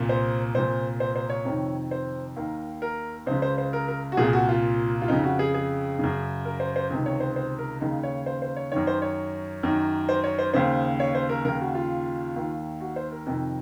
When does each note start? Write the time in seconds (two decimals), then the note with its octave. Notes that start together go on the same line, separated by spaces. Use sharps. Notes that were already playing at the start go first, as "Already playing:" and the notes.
Already playing: C2 A#2
0.09 C5
0.55 C2 A#2 C5
1.00 C5
1.16 C5
1.30 C#5
1.45 F2 C3 D#3
1.91 C5
2.36 D#2 D#3 A#4
2.82 A#4
3.26 C#2 C#3 C5
3.42 C5
3.58 C5
3.73 A#4
3.88 A#4
4.12 F#4
4.17 C2 A#2 G#4
4.33 F#4
4.49 F4
5.02 F4
5.08 F2 C#3 D#4
5.24 F#4
5.39 G#4
5.54 G#4
5.99 F#2 C#3
6.45 A#4
6.60 C5
6.76 C5
6.90 C#2 C3 D#3
7.06 C#5
7.20 C5
7.36 C5
7.59 A#4
7.81 D#2 C#3 D#4
8.03 C#5
8.26 C5
8.42 C5
8.56 C#5
8.72 F#2 D#3 C#5
8.87 C5
9.02 C#5
9.63 F#2 D#3
10.09 C5
10.24 C#5
10.39 C5
10.54 D#2 C#3 C5
11.00 C#5
11.15 C5
11.29 A#4
11.45 D#2 C#3 A#4
11.61 F#4
11.75 F4
12.36 D#2 D#3
12.80 F#4
12.96 C5
13.12 A#4
13.26 F2 C3 D#3